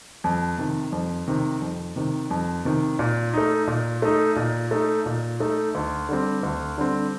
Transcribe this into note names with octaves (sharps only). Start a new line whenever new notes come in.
F2
C3 D#3
F2
C3 D#3
F2
C3 D#3
F2
C3 D#3
A#2
A3 D#4
A#2
A3 D#4
A#2
A3 D#4
A#2
A3 D#4
D2
D3 G3 C4
D2
D3 G3 C4